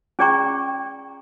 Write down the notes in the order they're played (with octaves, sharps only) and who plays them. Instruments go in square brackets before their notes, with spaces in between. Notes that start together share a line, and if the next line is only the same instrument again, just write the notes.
[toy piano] C#4 G#4 D5 G5 A#5 C#6